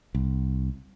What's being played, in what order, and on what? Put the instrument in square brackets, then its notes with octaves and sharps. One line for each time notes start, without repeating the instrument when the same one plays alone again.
[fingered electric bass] C2